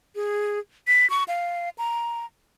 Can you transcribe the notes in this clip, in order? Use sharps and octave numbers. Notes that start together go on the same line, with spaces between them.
G#4
B6
C#6
F5
A#5